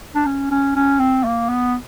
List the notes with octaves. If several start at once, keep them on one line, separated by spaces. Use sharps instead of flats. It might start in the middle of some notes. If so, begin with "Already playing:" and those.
D4
C#4
C#4
C#4
C4
A#3
B3